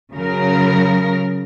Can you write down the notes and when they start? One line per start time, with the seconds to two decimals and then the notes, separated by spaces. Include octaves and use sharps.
0.13 C#3 F#3 A#4